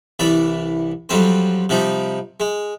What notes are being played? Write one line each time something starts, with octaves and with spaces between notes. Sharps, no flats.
C2 E3 D5 B5
F2 F#3 G3 C4 C5
C3 F3 G3 D#4
G#3